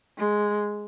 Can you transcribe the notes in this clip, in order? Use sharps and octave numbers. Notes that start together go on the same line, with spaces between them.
G#3